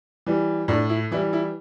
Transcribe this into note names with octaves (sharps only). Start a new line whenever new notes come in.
E3 G3
A2 D4
E4
E3 G3 E4
E4